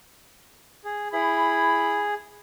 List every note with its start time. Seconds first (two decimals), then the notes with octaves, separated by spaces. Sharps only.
0.84 G#4
1.12 E4 G#4 B5